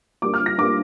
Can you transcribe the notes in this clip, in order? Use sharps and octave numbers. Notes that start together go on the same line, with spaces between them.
G2 G3 A#3 D6
F6
A#6
G2 G3 A#3 D6